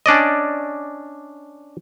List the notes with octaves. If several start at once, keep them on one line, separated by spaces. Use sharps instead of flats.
C#4 D4 D5 D#5